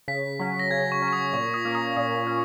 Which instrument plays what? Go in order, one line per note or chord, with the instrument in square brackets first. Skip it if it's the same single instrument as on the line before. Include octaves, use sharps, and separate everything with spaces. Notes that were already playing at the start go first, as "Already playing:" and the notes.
[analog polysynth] C#3 [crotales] B6
[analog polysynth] F#3 C#4
[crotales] A#6
[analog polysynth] C#3 [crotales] G#6
[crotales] C#6
[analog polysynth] F#3 C#4
[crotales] C#6
D#6
[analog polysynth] A#2 [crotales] C#6
[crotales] D#6
[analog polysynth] A#3 C#4
[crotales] D#6
[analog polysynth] A#2 [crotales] D#6
[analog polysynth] C#4